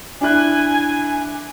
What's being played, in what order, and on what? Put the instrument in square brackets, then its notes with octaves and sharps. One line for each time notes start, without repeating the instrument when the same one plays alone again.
[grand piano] D4 E4 F#6 [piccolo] G#5